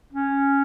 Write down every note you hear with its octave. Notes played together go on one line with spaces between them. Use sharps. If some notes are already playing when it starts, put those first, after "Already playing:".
C#4